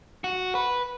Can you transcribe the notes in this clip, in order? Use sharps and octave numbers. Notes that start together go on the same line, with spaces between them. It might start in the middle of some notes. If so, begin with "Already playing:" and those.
F#4
B4